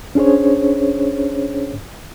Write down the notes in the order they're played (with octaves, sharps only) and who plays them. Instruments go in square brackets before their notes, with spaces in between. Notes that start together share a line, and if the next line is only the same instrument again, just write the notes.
[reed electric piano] C#4 D4 G#4 C5 C#5